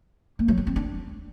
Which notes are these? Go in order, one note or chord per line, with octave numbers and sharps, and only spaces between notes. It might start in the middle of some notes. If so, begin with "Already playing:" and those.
A#3
F#3
B3
C4
D4